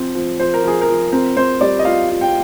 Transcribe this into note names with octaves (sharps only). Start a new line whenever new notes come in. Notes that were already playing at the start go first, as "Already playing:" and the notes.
Already playing: F3 C4
F3
F3 C5
A#4
F3 G#4
A#4
F3
C4 A#4
C4 C5
G3 D5
D#5
F4 F5
F4
G5